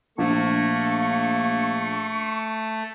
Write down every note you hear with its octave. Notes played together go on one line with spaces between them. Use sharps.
A#1 A3 A#3 D4 C#6